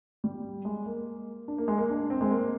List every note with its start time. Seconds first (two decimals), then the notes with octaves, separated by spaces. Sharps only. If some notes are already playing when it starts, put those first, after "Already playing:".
0.24 G3
0.65 G#3
0.86 A#3
1.48 D4
1.58 A#3
1.68 G#3
1.78 A#3
1.90 D4
2.10 C4
2.21 G#3
2.31 A#3